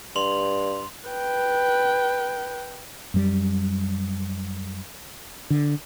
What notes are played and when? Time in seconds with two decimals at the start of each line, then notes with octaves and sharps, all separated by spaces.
0.16 G2 C6 F7 F#7
1.09 B4 G5
3.14 F#2 G3
5.50 D3